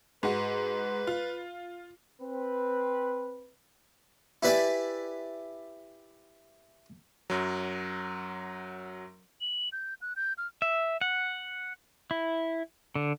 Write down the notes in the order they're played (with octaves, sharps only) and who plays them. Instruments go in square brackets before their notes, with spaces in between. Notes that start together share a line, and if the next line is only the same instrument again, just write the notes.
[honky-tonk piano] G#2 F#4 [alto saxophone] B4
[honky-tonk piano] F4
[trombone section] C4 B4
[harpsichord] E4 G4 B4 D5 E5 G#5
[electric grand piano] F#2 F#3
[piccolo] F#7
G6
F#6
G6
F6
[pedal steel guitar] E5
F#5
E4
D3